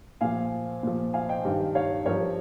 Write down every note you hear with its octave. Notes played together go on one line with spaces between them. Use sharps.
A#2 F3 F5 G#5
A#2 F3
F5 G#5
D#5 G5
G2 D#3
C#5 F5
G2 F3 A#4 C#5